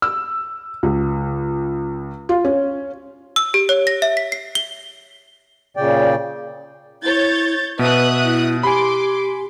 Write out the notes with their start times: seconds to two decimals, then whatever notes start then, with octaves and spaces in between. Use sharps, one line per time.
0.02 E6
0.83 C#2
2.29 F4
2.45 C#4
3.36 E6
3.54 G4
3.69 C#5
3.87 A#6
4.02 E5
4.17 B6
4.32 C7
4.55 G7
5.77 A#2 C#3 D5 G5
7.03 E4 C#5 G6 A6
7.79 B2 B4 E5 D#6 F#6
8.24 E4
8.63 G4 G#5 B5 C6 D6